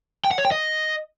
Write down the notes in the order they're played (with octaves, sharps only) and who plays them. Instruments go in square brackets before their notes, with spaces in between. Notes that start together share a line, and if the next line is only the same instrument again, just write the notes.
[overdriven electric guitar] G5
F#5
C#5
G5
D#5